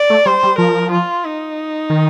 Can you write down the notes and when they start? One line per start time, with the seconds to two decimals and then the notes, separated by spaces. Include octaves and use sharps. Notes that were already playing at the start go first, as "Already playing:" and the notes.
Already playing: D5
0.10 A3
0.26 G3 C5
0.43 G3
0.58 F3 A#4
0.91 F4
1.25 D#4
1.90 D#3